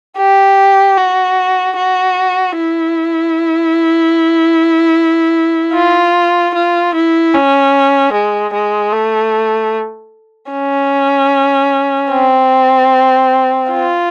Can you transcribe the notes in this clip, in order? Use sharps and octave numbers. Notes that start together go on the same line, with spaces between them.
G4
F#4
F#4
E4
F4
F4
E4
C#4
G#3
G#3
A3
C#4
C4
F4